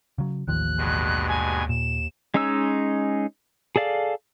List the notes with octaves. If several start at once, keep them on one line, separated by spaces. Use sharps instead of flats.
C#3 F#3
A1 D#2 D#3 F3 F#6
G2 B2 G#3
G#5
A#2 E7
G#3 C#4 D#4 C#5 E6
G#4 A4 D5 F5